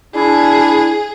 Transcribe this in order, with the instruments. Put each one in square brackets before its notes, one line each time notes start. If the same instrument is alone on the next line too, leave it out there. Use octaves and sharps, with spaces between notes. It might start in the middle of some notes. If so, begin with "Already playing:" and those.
[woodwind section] D4 E4 [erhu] G#4